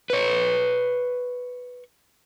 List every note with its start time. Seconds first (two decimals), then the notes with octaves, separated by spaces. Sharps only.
0.10 B4 C#5